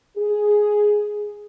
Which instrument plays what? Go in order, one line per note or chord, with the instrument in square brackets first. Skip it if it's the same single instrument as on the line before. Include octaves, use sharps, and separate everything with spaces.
[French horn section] G#4